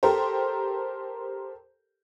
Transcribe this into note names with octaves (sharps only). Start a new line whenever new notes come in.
G4 A4 A#4 C5